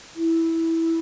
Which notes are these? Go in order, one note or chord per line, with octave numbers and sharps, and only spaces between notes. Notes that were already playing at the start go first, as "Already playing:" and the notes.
E4